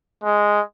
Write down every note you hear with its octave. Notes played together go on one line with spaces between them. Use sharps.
G#3